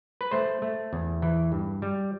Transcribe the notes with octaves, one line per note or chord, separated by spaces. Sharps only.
B4
A3 C5
A3
E2
E3
G2
G3